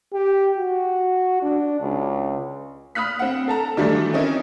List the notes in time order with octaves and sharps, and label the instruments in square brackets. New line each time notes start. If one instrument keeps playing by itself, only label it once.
[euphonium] G4
F#4
D4
C#2
[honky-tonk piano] B5 D#6 F6 F#6 B6
C4 F#5
A4 A5 A#5
D#3 E3 F#3 G3 A3 D4
C4 C#4 D#4 E4 A#4